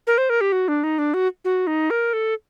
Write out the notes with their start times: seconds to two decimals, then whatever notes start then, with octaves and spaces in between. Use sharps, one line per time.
0.07 A#4
0.18 C5
0.30 A#4
0.41 G4
0.52 F#4
0.68 D4
0.84 D#4
0.99 D4
1.14 F#4
1.45 F#4
1.67 D#4
1.90 A#4
2.13 A4